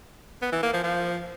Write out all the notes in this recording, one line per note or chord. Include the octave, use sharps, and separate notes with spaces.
B3
E3
A#3
F3
F3